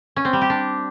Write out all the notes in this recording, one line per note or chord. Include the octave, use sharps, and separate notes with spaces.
C#4
C4
G3
G4
D4